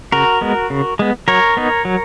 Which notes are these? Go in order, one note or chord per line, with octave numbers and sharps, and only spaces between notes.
C#3 F#4 A#4
G#3 B3
C#3
G#3 B3
F#3 A#4 C#5
B3 D#4
F#3